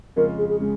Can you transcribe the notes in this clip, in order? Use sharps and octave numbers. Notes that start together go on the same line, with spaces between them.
F2 C#3 G#3 C#4 F4 A#4
G#4
G#4
C#3 G#3